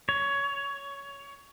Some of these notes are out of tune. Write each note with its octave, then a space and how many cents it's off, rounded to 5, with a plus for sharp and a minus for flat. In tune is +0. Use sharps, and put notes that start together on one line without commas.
C#5 +15